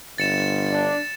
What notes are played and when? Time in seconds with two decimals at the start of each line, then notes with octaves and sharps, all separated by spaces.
0.18 G1 A6 C#7 E7
0.70 D4